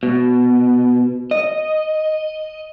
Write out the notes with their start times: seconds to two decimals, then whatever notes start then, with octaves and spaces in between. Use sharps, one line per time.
0.03 B2
1.31 D#5